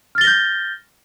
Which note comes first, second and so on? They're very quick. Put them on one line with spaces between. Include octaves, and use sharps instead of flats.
F6 A6 G7 A#6 G6